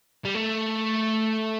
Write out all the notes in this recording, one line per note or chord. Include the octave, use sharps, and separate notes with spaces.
G3
A3